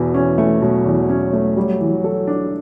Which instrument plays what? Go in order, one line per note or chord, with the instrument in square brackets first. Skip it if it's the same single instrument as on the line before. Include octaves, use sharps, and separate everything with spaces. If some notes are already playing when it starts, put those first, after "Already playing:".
Already playing: [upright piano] E2 B2 [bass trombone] E3
[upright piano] C#4
A3
[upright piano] B2 [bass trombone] F#3
[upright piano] E2
C#4
A3
[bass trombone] F#3 [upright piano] G3
[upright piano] E3
A4
D4